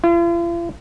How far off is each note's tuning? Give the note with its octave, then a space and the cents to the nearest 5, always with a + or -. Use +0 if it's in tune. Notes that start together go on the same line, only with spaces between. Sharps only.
F4 -45